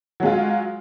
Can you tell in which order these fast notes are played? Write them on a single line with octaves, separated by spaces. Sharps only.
F#3 G#3 F4